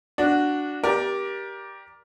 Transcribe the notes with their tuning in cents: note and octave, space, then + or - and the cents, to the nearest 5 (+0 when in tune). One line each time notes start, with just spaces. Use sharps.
D4 +0 F#4 +0
G4 +0 A#4 +25 D5 +0